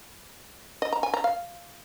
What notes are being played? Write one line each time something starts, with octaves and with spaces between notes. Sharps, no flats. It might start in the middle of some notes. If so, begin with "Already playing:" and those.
D#5
A#5
G#5
A#5
F5